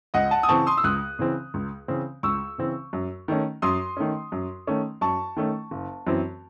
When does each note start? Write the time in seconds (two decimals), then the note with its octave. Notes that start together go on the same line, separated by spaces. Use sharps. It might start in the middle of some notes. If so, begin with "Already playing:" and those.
0.14 C#2 D#5 F#5
0.31 F#5 A5
0.43 D#6
0.49 C#3 E3 C4 A5 C#6
0.67 C6 D#6
0.77 E6
0.84 C#2 D#6 F#6
1.19 C#3 E3 C4
1.54 C#2
1.88 C#3 E3 C4
2.23 C#2 C#6 E6
2.58 C#3 E3 C4
2.93 F#2
3.28 D#3 A3 C#4
3.62 F#2 C6 D#6
3.97 D#3 A3 C#4
4.32 F#2
4.67 D#3 A3 C#4
5.01 F#2 A5 C#6
5.36 D#3 A3 C#4
5.71 F#1
6.07 F#2 E3 C4